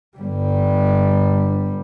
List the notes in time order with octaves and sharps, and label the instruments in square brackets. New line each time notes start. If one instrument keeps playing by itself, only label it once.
[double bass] G1 G3